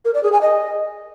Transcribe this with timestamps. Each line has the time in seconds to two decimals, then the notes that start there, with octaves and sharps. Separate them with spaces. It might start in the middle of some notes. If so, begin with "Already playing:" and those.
0.05 A#4
0.14 D5
0.23 G#4
0.32 G#5
0.41 D#5